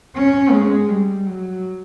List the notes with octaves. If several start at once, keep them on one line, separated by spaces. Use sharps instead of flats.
C#4
G#3
G3
F#3